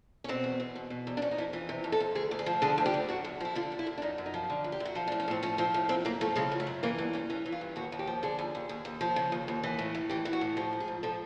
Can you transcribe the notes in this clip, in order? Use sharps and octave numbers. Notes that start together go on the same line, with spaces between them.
C#4
B2 C4
E2
E2
B2
B2
E2
D4
F2 C#4
D#4
F2 E4
E3 F4
C3
F2
A4
F2
D2 G#4
D2
G#4
F3
D3 G#4
D2
G4
D2
F#2 F#4
F#2
F3 E4
D3 F4
F#2
E4
F#2
D4
F#2 D#4
F#2
D#4
F3
D3
F#2
G4
F#2
F#4
F3 F4
D4
A2
C#4
A2 C4
F3 C#4
F3 C4
A2
F#2 C4
F#2 A#3
F3 A3
C#3 G#3
F#2
A3
F#2
E3 A#3
G2 B3
G2 C#4
E3 C#4
E3
F4
G2
D#2 F#4
D#2
G4
F3
D3 G#4
D#2
D#2
D#2
D#2
F3
C#3
D#2
D#2
E3
A2
A2
E3 G4
E3
F#4
A2
F3 G4
G#2
G#4
G#2
F3 A4